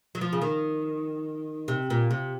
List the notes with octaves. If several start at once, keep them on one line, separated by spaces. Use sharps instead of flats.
F#3
F3
C#3
D#3
C3
A#2
C3